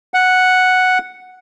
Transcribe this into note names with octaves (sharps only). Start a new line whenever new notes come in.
F#5